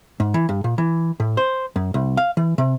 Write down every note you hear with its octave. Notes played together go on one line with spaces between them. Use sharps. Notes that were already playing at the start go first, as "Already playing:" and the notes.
G#2
E3
G2
A#2
E3
A2
C5
F#2
C2
F5
E3
C3